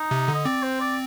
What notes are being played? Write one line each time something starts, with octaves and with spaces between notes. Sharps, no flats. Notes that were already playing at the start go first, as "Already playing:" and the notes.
Already playing: D#4
C3
D3
D#5
C4 D5
C5
D5